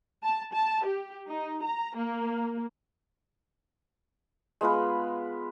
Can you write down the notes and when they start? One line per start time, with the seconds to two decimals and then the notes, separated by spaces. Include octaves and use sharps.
0.23 A5
0.53 A5
0.86 G4
1.29 D#4
1.64 A#5
1.96 A#3
4.61 G#3 B3 F4 B4